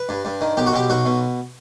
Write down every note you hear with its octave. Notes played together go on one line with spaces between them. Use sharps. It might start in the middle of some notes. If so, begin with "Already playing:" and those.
Already playing: B4
G2
G2
D#3
B1 G4
F#4
B2 G4
B1 F#4
B2